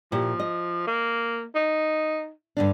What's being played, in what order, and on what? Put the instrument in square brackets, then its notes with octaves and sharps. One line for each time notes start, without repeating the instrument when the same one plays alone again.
[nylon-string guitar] A#2 E4 G4 [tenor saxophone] F3
[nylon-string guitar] D#5
[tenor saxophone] A#3
D#4
[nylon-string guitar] G2 D3 D4